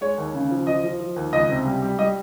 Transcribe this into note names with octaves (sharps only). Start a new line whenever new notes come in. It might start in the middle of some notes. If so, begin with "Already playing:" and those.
G#3 C#5
D#2
C#3
F3
F3 D#5
F3
F3
D#2
C#2 D#5
C3
G3
G3
G3 D#5